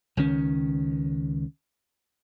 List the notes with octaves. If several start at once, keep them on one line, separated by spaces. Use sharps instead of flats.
C#2 D#3 C#4